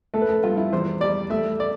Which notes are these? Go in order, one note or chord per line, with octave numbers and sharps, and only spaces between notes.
A3 A4
B4
A4
G2 F4
E4
E2 C5
G3 D5
A3 E5
D5